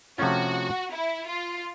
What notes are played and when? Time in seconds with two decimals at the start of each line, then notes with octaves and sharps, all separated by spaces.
0.18 C3 F3 A3 C#4 F4 F#4
0.92 E4
1.27 F4